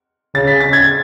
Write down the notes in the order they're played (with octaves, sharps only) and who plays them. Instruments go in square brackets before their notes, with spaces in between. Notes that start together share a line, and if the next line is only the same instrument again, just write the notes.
[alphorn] C#3 [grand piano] A6
[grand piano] B6
A6
G#6